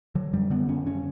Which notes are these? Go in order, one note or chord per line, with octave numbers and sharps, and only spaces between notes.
D3 F#3
F#2 G3
D3 B3
F#2 C#4
D3 C#4